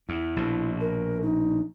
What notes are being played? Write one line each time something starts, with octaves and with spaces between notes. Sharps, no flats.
E2 E4
A#1 B2
A#4
D#4